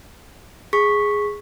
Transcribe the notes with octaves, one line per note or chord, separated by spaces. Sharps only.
G#4 C#6 B6